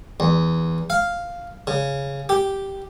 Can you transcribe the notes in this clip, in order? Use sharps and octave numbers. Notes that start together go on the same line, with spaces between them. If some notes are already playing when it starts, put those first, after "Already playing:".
E2
F5
C#3
G4